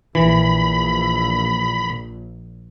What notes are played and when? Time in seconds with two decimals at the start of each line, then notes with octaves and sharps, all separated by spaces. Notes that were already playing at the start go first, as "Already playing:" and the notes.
0.15 A#1 E3 B5